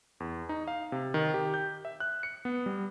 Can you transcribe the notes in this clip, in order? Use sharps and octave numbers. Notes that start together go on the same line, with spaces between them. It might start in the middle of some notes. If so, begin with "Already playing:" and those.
E2
D#4
F5
C3
D#3
G4
G6
E5
F#6
C#7
B3
G3